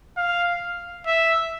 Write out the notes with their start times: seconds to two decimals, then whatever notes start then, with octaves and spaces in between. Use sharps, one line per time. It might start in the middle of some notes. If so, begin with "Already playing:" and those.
0.17 F5
1.06 E5